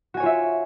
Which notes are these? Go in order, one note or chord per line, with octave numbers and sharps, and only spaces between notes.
F4 F#4 C#5 E5 G#5